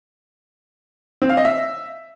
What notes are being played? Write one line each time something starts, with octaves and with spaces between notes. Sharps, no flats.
C4
F5
D#5
E5